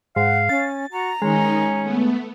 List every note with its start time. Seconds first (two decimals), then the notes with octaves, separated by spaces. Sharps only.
0.16 G#2 F5 F#5
0.49 C#4 A6
0.92 F#4 A#5
1.22 D#3 G#3 C#4 D#4
1.82 A3 B3